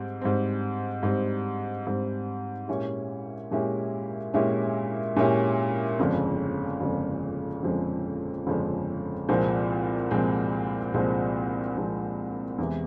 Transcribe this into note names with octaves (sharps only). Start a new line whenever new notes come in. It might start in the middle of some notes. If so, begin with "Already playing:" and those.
Already playing: G#2 G3 C4
G#2 G3 C4
G#2 G3 C4
G#2 G3 C4
A#2 G#3 C#4 E4 G4
A#2 G#3 C#4 E4 G4
A#2 G#3 C#4 E4 G4
A#2 G#3 C#4 E4 G4
G1 F2 C#3 F3 G#3
G1 F2 C#3 F3 G#3
G1 F2 C#3 F3 G#3
G1 F2 C#3 F3 G#3
C2 A#2 F3 G#3 C4
C2 A#2 F3 G#3 C4
C2 A#2 F3 G#3 C4
C2 A#2 F3 G#3 C4
E2 C3 E3 G#3